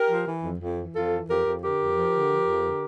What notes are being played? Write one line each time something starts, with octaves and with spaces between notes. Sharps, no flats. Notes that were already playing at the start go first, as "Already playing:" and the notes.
Already playing: G4 A#4
F3
E3
F2
F2
E3
F2 F4 A4
E3
F2 G4 A#4
F2
D3 G4 A#4
F2
F3
D3
F3
F2
D3